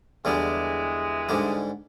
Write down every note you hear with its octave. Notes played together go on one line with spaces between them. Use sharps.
E2 D3 E3 G3 G#3
G#2 D3 G3